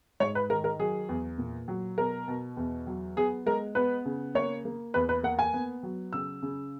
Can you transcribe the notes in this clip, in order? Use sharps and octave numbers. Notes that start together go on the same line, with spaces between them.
G#2 C#5
B4
D#3 A#4
A#4
F#3 G#4
E2
A#2
F#3
B2 A#4
B2
E2
F#3
B3 G#4
G#3 A#4
B3 B4
C#3
A#3 C#5
A#3
E2 B4
B4
A#3 F#5
G#5
B3
F#3
C#3 E6
C#3